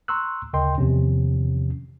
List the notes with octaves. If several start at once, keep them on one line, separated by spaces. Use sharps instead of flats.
A#5 C6 C#6 E6 F#6
D2 C#3 A#4 D#5 G5 C6
E2 C3 D#3 F3 C#4